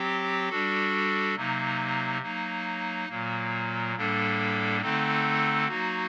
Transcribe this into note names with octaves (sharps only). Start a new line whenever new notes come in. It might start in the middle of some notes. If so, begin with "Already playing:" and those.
Already playing: F#3 C4 G4
G3 D4 F#4 A4
C3 F#3 A#3 D#4
F#3 A#3 D#4
A#2 F#3 A#3
A2 G3 A#3 D4 A4
D3 A3 C4 D#4 A4
F#3 A#3 D#4 F#4